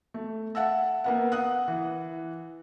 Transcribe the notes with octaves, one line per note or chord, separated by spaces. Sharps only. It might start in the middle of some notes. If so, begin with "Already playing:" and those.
A3
E5 F#5 A5 E6
A#3 B3 F#5
F#5 D#6 F#6
E3